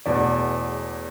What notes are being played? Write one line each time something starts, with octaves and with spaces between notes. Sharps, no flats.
E1 E2 B2 A3 D5